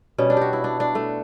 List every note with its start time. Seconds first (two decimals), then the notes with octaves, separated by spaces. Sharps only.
0.18 B2 G3 C#4
0.30 D4
0.37 F#4 G4
0.53 E4
0.64 D4
0.80 D4
0.95 A3